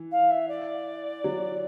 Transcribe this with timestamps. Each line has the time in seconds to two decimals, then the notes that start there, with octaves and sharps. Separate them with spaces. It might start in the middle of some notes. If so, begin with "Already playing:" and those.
Already playing: E3
0.11 F5
0.30 E5
0.48 D5
1.24 F#3